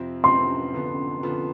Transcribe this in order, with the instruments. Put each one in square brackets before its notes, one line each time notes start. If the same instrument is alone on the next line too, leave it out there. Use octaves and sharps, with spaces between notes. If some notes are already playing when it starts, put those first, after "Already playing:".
Already playing: [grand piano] F2 C3 F3 C4
[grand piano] F2 C3 F3 C4 [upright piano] C6
[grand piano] D3 F3 B3
D3 F3 B3